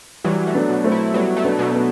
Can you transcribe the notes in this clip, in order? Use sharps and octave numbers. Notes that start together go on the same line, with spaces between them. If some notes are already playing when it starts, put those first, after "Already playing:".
E3 F#3 G3
A3
B3 D4
B2
A3 C4
E4
F#3 G3 B3
A3
B3 D4
B2
B3 D4